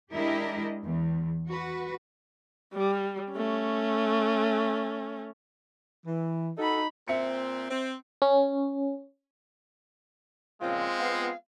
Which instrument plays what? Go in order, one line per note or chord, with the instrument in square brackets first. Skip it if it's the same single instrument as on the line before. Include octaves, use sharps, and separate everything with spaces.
[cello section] G#3 D4 E4 G4 A#4 D#5
E2
F#4 B4
[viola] G3
A3 C#4
[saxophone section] E3
[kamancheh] D#4 B5 [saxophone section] F#4 A4
[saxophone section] A#2 C4 [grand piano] E5 C#7
[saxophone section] C4
[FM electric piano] C#4
[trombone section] A#2 C#3 F3 [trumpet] G#3 [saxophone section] C4 F4
[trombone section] B3 [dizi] F5